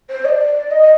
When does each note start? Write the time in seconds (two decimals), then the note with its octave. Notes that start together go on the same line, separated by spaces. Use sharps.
0.10 C5
0.25 D#5
0.28 D5
0.71 D#5